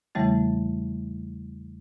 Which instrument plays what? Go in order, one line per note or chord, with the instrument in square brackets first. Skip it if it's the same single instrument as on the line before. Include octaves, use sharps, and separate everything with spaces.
[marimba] E2 C#3 E3 G3 A3 A6